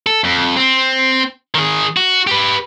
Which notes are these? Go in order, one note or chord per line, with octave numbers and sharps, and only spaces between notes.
A4
F2
C4
D#3 G#4
F#4
G4 B4